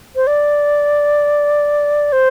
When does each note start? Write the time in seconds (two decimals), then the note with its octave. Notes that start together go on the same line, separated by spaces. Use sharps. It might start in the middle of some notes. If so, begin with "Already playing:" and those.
0.16 C5
0.27 D5
2.12 C5